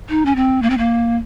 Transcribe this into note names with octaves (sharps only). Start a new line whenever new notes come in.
D#4
C#4
C4
A#3
C4
A#3